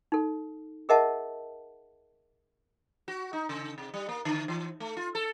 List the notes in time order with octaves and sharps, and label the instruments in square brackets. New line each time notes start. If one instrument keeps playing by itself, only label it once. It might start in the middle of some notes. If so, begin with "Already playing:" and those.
[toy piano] D#4 A4
G#4 A#4 D#5 E5 F#5 A5
[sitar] F#4
D#4
C#3
C3
G3
A#3
D3
E3
A3
F4
A4